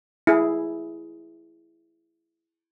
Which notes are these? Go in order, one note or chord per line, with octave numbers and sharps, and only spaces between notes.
E4 G#4